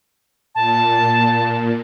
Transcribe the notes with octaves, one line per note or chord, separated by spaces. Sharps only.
A#2 A5